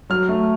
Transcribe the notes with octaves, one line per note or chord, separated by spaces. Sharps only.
F#3 F6
A3